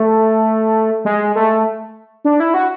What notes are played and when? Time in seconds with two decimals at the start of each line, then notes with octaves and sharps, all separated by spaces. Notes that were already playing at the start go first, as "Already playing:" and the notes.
Already playing: A3
1.05 G#3
1.35 A3
2.25 D4
2.40 E4
2.54 F#4